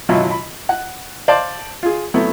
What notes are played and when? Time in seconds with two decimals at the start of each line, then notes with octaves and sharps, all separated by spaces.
0.09 G#1 B2 F#3 E4 F4
0.31 B5
0.69 F#5
1.28 C5 D5 F5 A5 C6 D6
1.83 F4 G#4
2.14 F#3 A3 B3 C4 E4